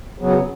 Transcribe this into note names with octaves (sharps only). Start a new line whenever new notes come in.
C#3 F#3 B3